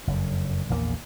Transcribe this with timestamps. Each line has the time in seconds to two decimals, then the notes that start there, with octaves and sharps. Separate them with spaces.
0.07 F#1 F2
0.69 A#1 E2 D#3 A#3